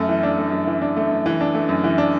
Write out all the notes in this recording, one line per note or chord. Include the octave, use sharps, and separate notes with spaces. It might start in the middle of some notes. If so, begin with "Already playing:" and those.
Already playing: F#2 A3
E3
D4
A3
F#2
E3
D4
A3
F#2
E3
D4
A3
F#2
E3
D4